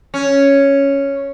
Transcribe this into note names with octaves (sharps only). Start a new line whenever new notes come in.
C#4